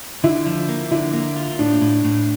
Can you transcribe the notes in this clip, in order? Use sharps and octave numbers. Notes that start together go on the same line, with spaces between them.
D3 E4
F3
A#3
D3 E4
A#3
F4
A2 D4
A2
A2